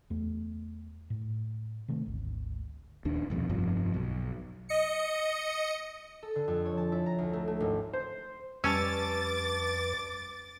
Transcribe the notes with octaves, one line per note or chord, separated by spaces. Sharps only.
E2 A3
A2
C3 D#3 A3
G#1 D2
D#1 D#2 D4
C2 F2 B2
F1 G2 F3
B1
D#5 C#7
A4
D3
F2
C#5
A5
E4
A#5
D2
A3
A3
G#1
C5
F2 G3 C#4 B4 A5 D6 E6 A6